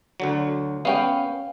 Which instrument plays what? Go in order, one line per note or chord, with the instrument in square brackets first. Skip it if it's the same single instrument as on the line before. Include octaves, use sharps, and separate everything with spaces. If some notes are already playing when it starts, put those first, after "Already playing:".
[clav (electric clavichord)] D2 D3 F#3
[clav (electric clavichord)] B3 C#4 [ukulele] F5 G5